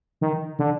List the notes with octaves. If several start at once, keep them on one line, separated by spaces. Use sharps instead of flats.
D#3
D3